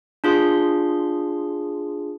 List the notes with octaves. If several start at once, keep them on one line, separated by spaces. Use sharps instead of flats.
D4 F4 G#4 C6